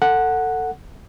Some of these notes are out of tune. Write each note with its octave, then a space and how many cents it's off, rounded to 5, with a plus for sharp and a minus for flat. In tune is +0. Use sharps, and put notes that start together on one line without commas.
A4 +25 F#5 -5